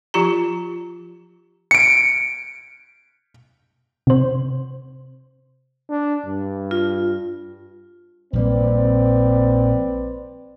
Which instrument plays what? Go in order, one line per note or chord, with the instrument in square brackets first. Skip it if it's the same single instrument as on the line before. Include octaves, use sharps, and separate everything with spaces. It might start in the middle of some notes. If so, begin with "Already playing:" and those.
[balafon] F3 F4 G4 A#5
[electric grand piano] C#7 D7
[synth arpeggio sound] C3 C5
[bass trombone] D4
G2
[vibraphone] F4
[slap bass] A#1 G3 A#3 [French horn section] C4 B4 D5